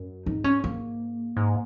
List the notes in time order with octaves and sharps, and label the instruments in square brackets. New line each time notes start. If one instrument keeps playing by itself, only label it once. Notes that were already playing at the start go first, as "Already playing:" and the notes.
Already playing: [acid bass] F#2
[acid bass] G#2 [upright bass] D#4
[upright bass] C#4
A#3
[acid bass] G#2